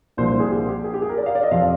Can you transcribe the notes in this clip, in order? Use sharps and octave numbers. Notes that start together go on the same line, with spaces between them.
C2 A#2 F3 A#3 D4 C5
C5
G#4
G4
G4
G#4
G4
G#4
A#4
D5
F5
D5
D#5
F2 C3 F3 C4 F5